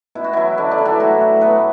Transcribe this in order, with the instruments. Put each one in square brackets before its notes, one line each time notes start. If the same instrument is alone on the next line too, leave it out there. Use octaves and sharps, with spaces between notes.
[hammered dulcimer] B2 E4
F#4
E3 F#3 E4
B2 D3 D4
D3 D4
F#3
E3 E4
A2 F#3 F#4
F#3
A2 B3 B4